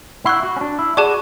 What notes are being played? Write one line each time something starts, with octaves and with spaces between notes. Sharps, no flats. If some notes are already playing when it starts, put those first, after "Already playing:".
E4 F#5 C#6 F#6
F#4
C#4
D4
E4
F#4 G#4 D5 A5 D6